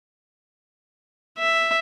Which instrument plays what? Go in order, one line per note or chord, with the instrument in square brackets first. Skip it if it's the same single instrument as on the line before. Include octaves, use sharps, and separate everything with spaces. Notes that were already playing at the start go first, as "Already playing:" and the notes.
[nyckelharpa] E5